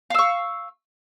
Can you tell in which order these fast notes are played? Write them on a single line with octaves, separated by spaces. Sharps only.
F5 E6 C#6